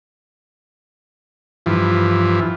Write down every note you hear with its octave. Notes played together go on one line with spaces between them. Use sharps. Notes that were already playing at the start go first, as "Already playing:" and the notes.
G2 E3 F3